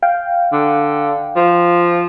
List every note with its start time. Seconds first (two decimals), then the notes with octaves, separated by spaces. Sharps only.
0.03 F5 G5
0.53 D3
1.36 F3